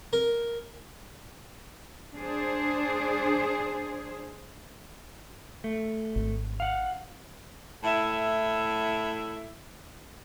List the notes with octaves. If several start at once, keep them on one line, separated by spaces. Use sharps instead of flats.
A#4
D4 G#4 C5
A3
G#1
F5 F#5
A2 E4 E5